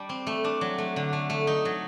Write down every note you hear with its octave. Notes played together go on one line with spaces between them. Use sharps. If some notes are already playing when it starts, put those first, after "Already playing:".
Already playing: G3 D4
C4
A3
D4
F#3
A3
D3
A3
A3
D#4
F#3